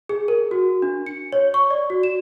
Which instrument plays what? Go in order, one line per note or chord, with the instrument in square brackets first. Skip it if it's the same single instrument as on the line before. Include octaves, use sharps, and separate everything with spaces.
[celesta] G#4
A#4
F#4
D4
C#7
C#5
C#6
D5
F#4
E7